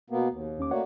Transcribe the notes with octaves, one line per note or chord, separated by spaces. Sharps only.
B2 A#3 B3
D#2
E2 C#4 D6
A3 A#3 F#4 C#5 D5 F#5